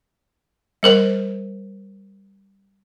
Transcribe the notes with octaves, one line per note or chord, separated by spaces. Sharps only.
G3 A#4 C5